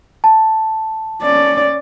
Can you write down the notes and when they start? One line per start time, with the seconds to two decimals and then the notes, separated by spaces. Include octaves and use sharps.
0.24 A5
1.22 C#4 D5